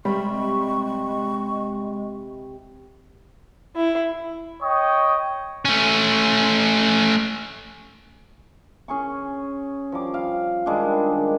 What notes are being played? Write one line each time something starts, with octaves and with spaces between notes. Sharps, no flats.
C3 G3 G#3 B5 C#6
E4
C#5 D#5 G5 C#6 D#6
A3 C#4
C#4 G#4 C#6
F3 G3 D6
F5
D#3 G3 G#3 D4
D#3